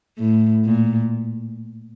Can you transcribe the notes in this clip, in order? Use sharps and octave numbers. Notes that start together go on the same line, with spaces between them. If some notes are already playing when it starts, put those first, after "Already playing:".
A2
A#2